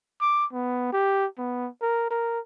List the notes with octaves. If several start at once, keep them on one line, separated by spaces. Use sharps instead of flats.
D6
B3
G4
B3
A#4
A#4